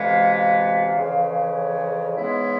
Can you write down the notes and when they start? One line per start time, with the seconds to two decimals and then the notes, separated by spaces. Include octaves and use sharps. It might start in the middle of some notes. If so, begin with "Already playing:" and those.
Already playing: D2 C3 E3 G#3 B3 F5
0.32 F5
0.94 F2 C#3 E3
1.55 C#5
2.17 G#2 E3 G#3 B3 E4 C#5